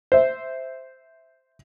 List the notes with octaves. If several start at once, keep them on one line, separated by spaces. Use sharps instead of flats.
C5 E5